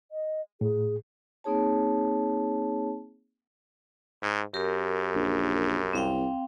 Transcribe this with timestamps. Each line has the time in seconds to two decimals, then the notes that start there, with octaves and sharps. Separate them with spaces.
0.12 D#5
0.61 A2 G#4
1.44 A#3 C4 D#4 G#4 C#5 A5
4.23 G#2
4.54 F#2 G4 A#4
5.15 A#1
5.93 C2 C4 F5 G5